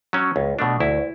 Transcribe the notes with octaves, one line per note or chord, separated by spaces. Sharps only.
F#3 C#4
C#2
B2 A3 D4
D2 E4